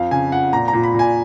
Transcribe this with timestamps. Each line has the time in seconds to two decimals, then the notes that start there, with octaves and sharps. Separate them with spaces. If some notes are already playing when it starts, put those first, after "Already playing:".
Already playing: F2 F5
0.11 C#3 G#5
0.32 F2 F#5
0.53 A#2 A#5
0.68 A#5
0.73 A#2
0.83 B5
0.94 A#2 G#5